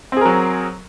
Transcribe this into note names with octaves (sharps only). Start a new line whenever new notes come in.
F#3 C4 G#4 A#4